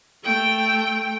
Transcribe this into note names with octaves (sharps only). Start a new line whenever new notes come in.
A3 G5